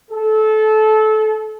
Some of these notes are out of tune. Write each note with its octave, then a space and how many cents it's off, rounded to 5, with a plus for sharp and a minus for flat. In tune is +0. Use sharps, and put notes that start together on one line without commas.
A4 -25